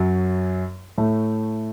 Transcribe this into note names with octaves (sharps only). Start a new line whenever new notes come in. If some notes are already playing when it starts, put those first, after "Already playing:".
Already playing: F#2 F#3
A2 A3